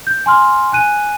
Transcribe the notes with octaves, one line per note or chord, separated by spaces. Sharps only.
G6
G#5 C6 F6
G#5 F#6 D#7